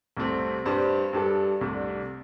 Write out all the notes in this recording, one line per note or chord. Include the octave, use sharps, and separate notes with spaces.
C2 C3 A3 C4
G2 G3 D4 G4 C5
G2 G3 D4 A4
C2 C3 A3 D4